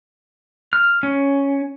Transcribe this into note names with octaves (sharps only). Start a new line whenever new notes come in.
F6
C#4